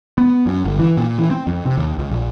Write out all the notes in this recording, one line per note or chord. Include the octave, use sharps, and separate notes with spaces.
B3
F#2
G1
E3
A#2
E3
C4
F2
C3
D#2
C#2
A#1